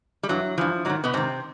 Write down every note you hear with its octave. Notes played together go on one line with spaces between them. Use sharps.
G3
G2 E3 F#3
G2 E3 F3
G#2 D#3 F#3
B2 B3
G#2 C3 D#3 C4